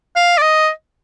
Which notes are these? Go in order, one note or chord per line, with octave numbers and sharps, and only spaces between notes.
F5
D5
D#5